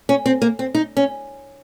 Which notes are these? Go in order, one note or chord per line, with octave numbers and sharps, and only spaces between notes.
C#4
C4
A#3
C4
D#4
C#4